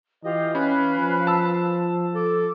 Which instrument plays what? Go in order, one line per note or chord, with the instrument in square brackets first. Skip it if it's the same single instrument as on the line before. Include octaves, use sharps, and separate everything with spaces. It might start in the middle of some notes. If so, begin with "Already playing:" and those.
[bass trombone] E3 [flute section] F4 G4 [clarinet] D#5
[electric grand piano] C#4 [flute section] B4 F5 F#6 [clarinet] B5
[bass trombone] F3
[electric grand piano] A5 E6
[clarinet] A4 [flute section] D6